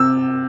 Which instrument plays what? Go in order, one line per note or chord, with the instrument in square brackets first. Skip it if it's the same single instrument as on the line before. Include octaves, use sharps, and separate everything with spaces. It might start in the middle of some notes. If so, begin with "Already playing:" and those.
Already playing: [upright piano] C3 E6